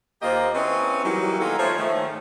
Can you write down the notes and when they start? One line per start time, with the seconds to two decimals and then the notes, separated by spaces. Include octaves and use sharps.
0.22 D#2 A#3 F4 G4 C5 D#5
0.54 C4 C#4 E4 G#4 B4
1.04 E3 F#3 G3 A#3 D#4 E4
1.39 D#3 A#3 B3 F4 G#4 A4
1.59 F3 A3 C#5
1.78 G#2 D#3 F3 A3